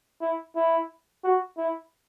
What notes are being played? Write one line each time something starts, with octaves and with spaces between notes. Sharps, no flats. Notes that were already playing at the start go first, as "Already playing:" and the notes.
E4
E4
F#4
E4